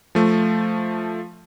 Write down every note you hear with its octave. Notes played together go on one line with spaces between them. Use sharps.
F3 A3